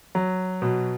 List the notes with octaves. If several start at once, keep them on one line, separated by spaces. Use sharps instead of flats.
F#3
B2